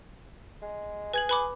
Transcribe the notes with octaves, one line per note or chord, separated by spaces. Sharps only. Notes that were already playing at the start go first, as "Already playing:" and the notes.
G#3
G#4 B4 G#6 F#7
B4 B5 D6